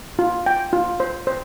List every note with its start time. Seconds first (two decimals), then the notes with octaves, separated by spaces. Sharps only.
0.19 F4
0.46 G5
0.73 F4
1.00 C5
1.27 C5